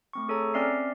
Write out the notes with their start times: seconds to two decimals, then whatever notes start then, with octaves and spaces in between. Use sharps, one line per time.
0.13 A3 C4 C#6
0.29 G#4 A4 C#5 A#5
0.54 C4 C#4 D5 E5 F6 C7